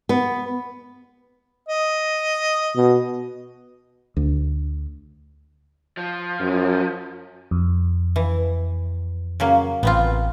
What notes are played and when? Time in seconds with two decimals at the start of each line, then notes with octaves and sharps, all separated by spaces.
0.09 B3
1.68 D#5
2.75 B2
4.16 D2
5.97 F3
6.40 F#2
7.51 F2
8.16 E3
9.40 C#3 F#3 A#3
9.83 A1 B3 C4 F4